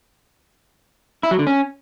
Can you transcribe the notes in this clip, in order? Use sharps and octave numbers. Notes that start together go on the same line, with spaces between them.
E4
F#3
D3
C#4